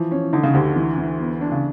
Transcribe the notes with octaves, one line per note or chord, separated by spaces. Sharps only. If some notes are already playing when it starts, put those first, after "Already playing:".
Already playing: E3 F3
C#4
D3 D#4
C#3
D2 D3 G4
E3
E3
B3
D4
C#3